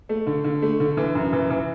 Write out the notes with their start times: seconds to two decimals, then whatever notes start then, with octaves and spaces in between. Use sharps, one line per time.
0.09 A3
0.27 D3
0.44 D3
0.62 A3
0.80 D3
0.97 E3
1.15 F#2
1.33 E3
1.50 E3